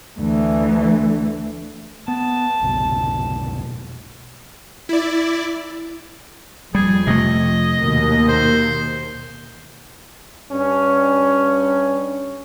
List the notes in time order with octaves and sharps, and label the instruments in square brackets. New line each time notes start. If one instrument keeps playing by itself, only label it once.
[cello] D2 E3
[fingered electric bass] B3 [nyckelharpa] A5
[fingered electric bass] F1 B1 B2
[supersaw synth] E4 D5
[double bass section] F2 [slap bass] G3 [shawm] G#4
[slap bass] C3 A3 [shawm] D#5
[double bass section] D#2 B2 A#3
[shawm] C5
[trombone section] G2 C#4